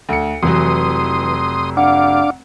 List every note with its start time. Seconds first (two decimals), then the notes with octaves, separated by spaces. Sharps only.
0.09 D2 C#7
0.42 F1 E3 F#3 C6 D#6
1.77 D4 F5 F#5 D6